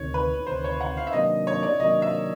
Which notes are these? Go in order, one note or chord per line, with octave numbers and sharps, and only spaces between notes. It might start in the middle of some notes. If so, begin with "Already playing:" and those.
Already playing: D2 C3 D#3 C#5
B4
D2 C3 D#3 C5
C#5
F#5
F5
E5
C3 D#3 F#3 A#3 D4 D#5
C#5
D5
C3 D#3 F#3 A#3 D4 D#5
E5